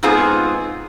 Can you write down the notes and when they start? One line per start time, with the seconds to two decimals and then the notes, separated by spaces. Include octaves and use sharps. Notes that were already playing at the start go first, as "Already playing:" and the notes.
0.03 G#2 B3 C4 D#4 F4 G#4